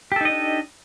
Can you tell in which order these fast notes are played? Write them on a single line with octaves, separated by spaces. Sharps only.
G4 A4 D#4 D#5 D4